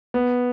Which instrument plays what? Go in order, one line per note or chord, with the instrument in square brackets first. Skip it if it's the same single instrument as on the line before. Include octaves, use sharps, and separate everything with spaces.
[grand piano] B3